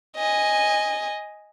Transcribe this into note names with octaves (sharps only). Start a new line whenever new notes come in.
D#5 G#5